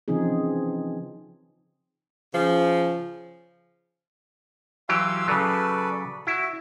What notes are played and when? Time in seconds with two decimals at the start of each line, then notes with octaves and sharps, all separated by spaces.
0.08 C#3 E3 F3 C4 D#4 G#4
2.33 C#3 F3
4.89 E3 F#3 G4 F5 C6 E6
5.28 C#3 F#3 A4 B4 D5
6.27 E4 F#4